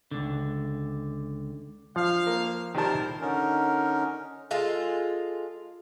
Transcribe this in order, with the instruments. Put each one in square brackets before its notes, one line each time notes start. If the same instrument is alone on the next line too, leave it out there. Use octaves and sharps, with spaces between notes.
[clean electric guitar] C#2 D3
[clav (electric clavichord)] F3 [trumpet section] D4 F5
[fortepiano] A#3
[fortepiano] D#3 G3 A5 [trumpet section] E4 A#4 C5
[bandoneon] D3 C#4 D#4 A#4
[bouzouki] G#3 F4 A4